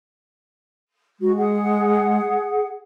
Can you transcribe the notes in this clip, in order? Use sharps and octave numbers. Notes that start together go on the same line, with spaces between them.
G#3 F#4
G#4 F#5